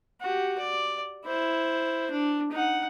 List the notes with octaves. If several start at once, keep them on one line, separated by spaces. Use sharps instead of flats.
F#4 G4
D5
E4 C5
D4
D#4 F#5